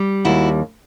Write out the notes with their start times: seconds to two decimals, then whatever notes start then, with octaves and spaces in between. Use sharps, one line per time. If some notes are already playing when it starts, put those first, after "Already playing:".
Already playing: G3
0.25 D#2 E4 F#4